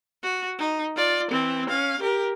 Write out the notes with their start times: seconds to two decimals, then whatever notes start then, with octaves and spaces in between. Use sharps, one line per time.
0.23 F#4
0.58 D#4
0.96 F4 D5
1.31 E3 C4
1.69 C#4 F5
2.00 G4 A#4